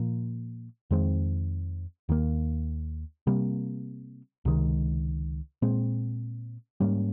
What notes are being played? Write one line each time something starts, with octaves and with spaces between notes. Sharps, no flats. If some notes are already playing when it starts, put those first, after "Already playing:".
Already playing: A#2 F3 A#3
F2 D#3 G#3 C4
D#2 D#3 A#3
C3 G3 A#3
C#2 C3 D#3 G#3
A#2 G#3 C4
G#2 G3 A#3 C#4